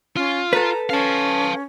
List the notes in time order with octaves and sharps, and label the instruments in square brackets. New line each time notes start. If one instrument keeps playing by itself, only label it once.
[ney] C#4 [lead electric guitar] F4
[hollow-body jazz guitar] A4 B4 [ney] A#5
[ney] C#4 [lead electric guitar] F5 A5